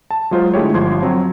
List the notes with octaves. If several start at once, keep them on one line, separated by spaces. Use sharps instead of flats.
A5
F#3 G#3 F4 G#4 C5
D3 G#3 A3 E4 G4 C#5
G1 F3 C6 G#6
F#3 C4